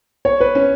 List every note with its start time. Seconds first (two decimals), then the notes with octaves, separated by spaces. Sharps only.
0.25 C#5
0.41 B4
0.55 C#4